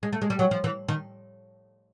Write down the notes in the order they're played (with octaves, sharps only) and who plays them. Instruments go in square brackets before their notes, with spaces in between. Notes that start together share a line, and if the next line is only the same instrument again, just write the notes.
[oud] G#3
A3
G#3
G3
F#3
F3
E3
D#3